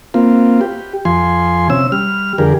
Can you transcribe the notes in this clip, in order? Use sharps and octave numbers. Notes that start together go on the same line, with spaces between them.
A#3 C4 F4
G4
F2 F3 G#5 C6
C3 C#4 E6
G3 F6
F2 D3 G4 G#4 A#4